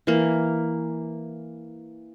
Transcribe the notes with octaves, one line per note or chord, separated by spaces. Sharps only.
E3 A#3